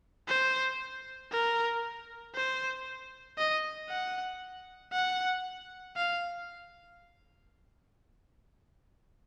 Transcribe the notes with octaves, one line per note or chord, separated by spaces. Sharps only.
C5
A#4
C5
D#5
F#5
F#5
F5